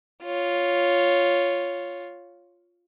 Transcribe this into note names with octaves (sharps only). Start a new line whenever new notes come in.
F4 C#5